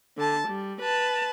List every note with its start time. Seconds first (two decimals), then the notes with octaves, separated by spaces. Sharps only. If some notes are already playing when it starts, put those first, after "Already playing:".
0.17 D3 A5
0.48 G3
0.82 B4 A5